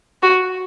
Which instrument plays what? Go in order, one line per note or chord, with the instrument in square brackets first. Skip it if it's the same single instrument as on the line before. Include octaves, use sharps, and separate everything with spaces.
[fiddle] F#4